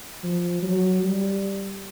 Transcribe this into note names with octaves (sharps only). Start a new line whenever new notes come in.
F3
F#3
G3